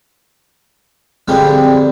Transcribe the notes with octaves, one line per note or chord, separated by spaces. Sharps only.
F2 D3 G3 G#3 C4 D#6